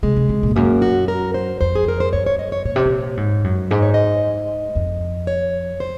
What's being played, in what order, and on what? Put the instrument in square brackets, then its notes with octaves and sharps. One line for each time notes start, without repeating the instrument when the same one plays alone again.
[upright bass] C3 [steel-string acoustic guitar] G#3
[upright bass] C3
C3
A#2
F2
[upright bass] F#2 [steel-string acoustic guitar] A#3
[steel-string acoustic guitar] F#4
A#4
C5
[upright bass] F2 [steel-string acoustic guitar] C5
[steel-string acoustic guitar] G#4
A#4
C5
[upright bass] F#2 [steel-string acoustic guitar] C#5
[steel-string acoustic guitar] C#5
D#5
C#5
[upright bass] A#2 [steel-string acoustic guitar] C#5
[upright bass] C3
A#2
G#2
F#2
[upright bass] G#2 [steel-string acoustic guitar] D#5
[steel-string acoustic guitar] C#5
D#5
[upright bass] F2
[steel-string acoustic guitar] C#5
C5